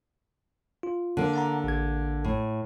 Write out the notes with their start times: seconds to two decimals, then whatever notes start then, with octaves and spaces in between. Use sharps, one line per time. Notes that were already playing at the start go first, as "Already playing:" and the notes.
0.83 F4
1.17 D3 A#3
1.33 F#5 A5 A#5
1.64 A1 G#6
2.24 A2